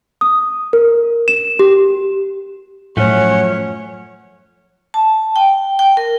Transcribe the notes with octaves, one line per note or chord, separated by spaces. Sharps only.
D#6
A#4
E7
G4
F#2 A2 F3 A3 C#4 C#5 F#5
A5
G5
G5
A#4